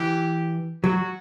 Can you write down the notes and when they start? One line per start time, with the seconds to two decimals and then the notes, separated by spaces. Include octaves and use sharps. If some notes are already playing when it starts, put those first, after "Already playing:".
Already playing: E3 G4
0.84 F#3 F#4